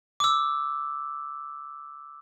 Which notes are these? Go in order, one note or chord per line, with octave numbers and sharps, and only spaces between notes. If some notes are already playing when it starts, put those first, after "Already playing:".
D6 E6